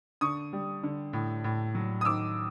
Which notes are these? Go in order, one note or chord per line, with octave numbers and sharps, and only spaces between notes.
D3 C#6 D#6
G3
D3
A2
A2
F#3
D#6
D#3 D6 E6